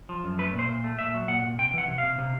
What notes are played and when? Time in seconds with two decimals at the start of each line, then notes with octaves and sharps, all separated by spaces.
0.09 F3
0.24 F#2
0.38 A3 B4
0.53 A#2
0.59 C5
0.68 A#2
0.84 A3
0.99 A#2 E5
1.14 F#3
1.28 A#2 F#5
1.44 A#2
1.58 C3 G5
1.73 E3 F#5
1.88 C3
1.98 F5
2.03 C3
2.18 C3